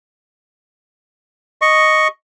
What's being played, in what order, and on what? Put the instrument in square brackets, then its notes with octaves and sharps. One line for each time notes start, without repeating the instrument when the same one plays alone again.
[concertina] D#5 C#6